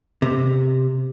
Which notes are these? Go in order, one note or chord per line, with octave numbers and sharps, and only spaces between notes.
C3